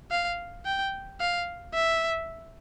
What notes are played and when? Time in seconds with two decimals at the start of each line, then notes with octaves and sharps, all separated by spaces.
0.11 F5
0.66 G5
1.20 F5
1.74 E5